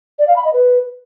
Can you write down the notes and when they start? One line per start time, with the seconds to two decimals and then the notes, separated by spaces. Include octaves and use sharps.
0.19 D5
0.27 F5
0.36 B5
0.45 D#5
0.53 B4